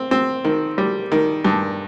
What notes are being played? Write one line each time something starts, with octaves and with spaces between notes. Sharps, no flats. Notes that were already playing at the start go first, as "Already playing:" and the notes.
Already playing: C4
C4
D#3
G3
D#3
G2